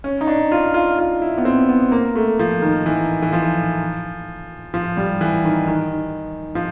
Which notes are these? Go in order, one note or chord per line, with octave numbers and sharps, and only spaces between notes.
C#4
D#4
D4
F4
F4
F4
E4
B3
C4
B3
A#3
A3
F3
D#3
E3
E3
F3
F3
G3
E3
D#3
D#3
F3